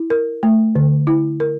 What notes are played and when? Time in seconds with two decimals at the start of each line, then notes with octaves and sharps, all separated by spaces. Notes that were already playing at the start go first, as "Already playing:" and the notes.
Already playing: E4
0.10 A#4
0.43 A3
0.75 D3
1.07 E4
1.40 A#4